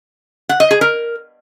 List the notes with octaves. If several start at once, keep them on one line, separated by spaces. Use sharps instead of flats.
F#5
D#5
G#4
A#4